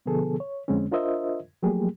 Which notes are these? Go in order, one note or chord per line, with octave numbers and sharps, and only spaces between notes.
B2 D3 F3 B3 G#4 A4
C#5
F2 D3 G#3 C4 C#4
D4 F4 A#4 C5 D#5 E5
F3 F#3 A3 A#3 G4 G#4